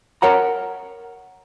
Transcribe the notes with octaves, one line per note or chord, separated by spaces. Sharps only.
A#4 C#5 F#5 A#5